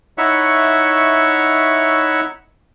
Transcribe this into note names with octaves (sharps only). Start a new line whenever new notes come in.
D#4 E4 C#5 E5 F#5 C#6